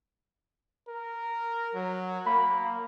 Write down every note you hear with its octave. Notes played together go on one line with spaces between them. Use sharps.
A#4
F#3
A#3 B5